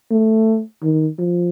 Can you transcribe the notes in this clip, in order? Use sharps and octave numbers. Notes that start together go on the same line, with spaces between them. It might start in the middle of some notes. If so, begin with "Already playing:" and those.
A3
D#3
F3